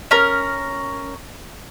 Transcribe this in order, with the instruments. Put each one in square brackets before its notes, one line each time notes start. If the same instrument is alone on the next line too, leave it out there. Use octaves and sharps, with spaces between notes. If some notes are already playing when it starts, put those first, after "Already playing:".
[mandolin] C#4 A#4